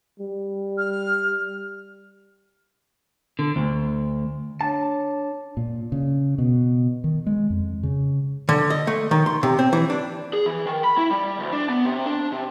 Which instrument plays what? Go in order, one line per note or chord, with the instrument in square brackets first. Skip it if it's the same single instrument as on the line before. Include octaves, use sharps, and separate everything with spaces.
[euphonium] G3
[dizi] F6
[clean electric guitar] D3
D2
[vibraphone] D4 C#5 [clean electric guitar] A5
[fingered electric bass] A#2
C#3
B2
D#3
G#3
F2
C#3
[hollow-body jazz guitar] D3
D#5
A3
D#3
C6
C3
C4
E3
D4
[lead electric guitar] G#4
E3
D#3
B5
E4
G3
D2
D4
B3
C3
D4
C3